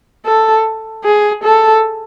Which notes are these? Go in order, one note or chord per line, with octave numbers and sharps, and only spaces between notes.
A4
G#4
A4